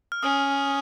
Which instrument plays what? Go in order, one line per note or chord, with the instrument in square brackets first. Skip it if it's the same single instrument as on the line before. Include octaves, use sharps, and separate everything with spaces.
[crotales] F6
[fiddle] C#4 [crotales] D#6